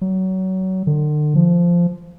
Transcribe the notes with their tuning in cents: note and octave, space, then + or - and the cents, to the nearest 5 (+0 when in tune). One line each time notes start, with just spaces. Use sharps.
F#3 +25
D3 +40
F3 -10